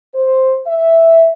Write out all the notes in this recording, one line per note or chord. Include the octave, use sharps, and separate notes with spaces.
C5
E5